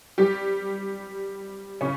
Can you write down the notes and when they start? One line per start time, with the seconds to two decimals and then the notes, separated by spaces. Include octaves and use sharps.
0.18 G3 G4
1.81 C#3 C#4